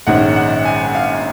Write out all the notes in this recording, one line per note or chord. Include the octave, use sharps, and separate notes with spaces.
A#1 G#2 D#3 G#3 C#4 F#5
F#5
G#5
F5